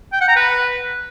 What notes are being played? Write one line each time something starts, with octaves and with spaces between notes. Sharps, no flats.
G5
F#5
A#5
B4